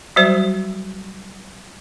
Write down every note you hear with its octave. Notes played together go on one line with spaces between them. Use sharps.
F#3 G3 F#4 C5